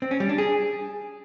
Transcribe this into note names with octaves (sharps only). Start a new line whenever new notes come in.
C4
C#4
G3
D4
G#4